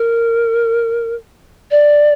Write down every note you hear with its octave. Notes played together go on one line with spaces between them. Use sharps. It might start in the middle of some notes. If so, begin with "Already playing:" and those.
Already playing: A#4
D5